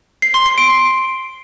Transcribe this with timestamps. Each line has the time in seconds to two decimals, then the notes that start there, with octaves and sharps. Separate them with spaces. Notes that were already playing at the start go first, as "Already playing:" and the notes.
0.22 C7
0.34 C6
0.46 C7
0.58 D7